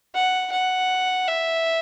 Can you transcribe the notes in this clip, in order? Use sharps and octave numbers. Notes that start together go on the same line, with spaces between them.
F#5
F#5
E5